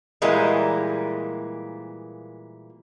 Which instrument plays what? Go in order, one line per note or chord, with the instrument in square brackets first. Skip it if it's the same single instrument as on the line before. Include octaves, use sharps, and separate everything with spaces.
[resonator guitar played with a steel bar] A#2 E3 G3 G#3 A#3